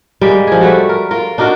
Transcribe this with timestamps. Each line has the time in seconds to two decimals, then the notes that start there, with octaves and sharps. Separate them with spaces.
0.21 G3 G#3 A#3
0.47 F3 G#4
0.61 G3 A3 F#4
0.89 A#4
1.11 F4 A#4
1.38 D4 D#4 F#4 A#4